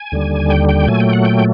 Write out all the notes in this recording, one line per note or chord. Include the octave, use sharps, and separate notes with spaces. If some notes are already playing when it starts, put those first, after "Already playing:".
Already playing: G#5
D#2 D3 G3
G5
G5
A#2 F#3 A3 G#5
G5
F#5
G5